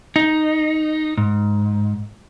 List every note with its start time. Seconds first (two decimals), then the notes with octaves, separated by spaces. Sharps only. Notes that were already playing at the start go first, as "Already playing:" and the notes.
0.16 D#4
1.18 G#2